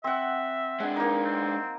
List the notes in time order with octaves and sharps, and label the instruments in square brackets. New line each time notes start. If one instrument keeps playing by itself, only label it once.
[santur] C4 F#5 [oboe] E5
[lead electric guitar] G#3 D4 [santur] F#5
[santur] A#3 D#4
[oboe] C4